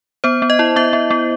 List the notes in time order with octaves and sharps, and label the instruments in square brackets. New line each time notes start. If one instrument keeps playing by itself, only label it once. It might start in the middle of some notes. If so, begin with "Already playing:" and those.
[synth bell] B3 C5
B3
D#5
E4
B3 E5
B3
B3